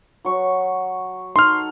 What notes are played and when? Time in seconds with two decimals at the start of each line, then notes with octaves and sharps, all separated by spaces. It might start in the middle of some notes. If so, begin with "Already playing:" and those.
0.25 F#3 C#6
1.36 D#4 A4 C6 F6